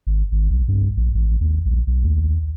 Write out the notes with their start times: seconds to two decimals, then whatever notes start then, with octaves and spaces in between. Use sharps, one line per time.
0.07 G#1
0.32 G#1
0.51 B1
0.68 G2
0.97 A#1
1.15 A1
1.41 D#2
1.65 A#1
1.87 B1
2.04 D#2